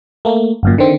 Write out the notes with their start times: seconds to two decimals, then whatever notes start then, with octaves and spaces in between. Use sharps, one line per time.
0.25 A3 A#3
0.63 G1 F#2 A#2
0.78 D3 D#3 C4